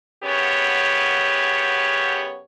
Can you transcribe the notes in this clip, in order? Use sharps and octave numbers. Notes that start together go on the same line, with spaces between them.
F#2 C#3 B3 G4 C#5